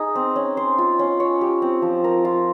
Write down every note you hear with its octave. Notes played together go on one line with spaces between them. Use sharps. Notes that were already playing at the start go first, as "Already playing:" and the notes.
Already playing: D#4 G#4
C4
C#4
C5
F4
C#4
C#5
G4
C4
F3
A#4
F4